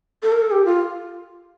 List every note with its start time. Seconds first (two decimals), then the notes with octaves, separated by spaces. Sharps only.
0.23 A4
0.32 A#4
0.41 A4
0.51 G4
0.65 F4